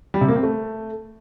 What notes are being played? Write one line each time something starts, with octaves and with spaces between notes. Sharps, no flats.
G3
C3
A#3
C4
A3